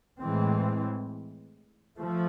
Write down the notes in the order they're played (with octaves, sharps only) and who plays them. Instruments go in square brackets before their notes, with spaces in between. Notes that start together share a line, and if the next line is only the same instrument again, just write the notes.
[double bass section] A2 E3 G#3 C4
F3 A3